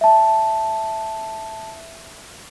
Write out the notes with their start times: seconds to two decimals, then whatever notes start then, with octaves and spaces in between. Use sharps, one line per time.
0.01 E5 A5